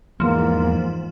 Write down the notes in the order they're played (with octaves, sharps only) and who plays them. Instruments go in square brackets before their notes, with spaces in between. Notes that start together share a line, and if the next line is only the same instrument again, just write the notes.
[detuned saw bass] E2 [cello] G#2 E3 [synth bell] F3 [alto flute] A#3